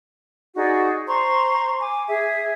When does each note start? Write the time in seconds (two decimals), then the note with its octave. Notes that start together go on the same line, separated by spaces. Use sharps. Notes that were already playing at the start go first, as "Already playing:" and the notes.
0.55 D#4 F#4 G#4 D5
1.07 C5 A#5 C6 C#6
1.79 G#5 D6
2.08 G#4 E5